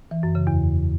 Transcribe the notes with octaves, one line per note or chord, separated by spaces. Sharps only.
E3
F#2
C#3
E2